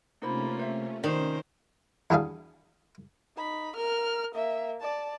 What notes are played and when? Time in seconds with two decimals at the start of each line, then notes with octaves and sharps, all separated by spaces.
0.22 C3 A3 A#3 C#4 D#4 F4 C5 B5
0.59 C5 E5
1.04 D#3 C#4 A#4 C5 D5
2.10 E2 F#3 G3 D4 G#4 F5
3.37 D#4 B5
3.76 A#4 F6
4.34 A#3 E5
4.81 D5 A5